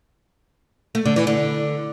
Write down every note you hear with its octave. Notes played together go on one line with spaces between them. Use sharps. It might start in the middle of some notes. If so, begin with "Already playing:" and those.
A3
D3
E3
D3